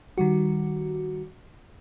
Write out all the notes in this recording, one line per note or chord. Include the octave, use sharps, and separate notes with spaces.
D#3 G3 F#4